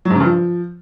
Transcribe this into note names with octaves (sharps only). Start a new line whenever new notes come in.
F#3
G#2
C#3
G2
F3